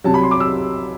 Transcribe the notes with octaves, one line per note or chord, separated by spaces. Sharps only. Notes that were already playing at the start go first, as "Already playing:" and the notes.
C2 C3 F#3 A5
B5
C6
D6
E6